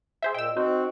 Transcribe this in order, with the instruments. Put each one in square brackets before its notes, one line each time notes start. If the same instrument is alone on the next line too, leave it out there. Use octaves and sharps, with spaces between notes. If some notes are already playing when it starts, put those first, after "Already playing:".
[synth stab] G#4 C5 E5
[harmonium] A#2 [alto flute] D#5 [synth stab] G5 E6
[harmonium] C4 [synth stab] D#4 C5 [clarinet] F#4